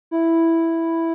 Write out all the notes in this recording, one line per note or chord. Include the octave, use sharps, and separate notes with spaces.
E4